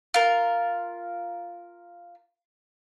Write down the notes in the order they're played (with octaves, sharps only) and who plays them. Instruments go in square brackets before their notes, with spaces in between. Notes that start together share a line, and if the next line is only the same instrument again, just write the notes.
[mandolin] F4 A#4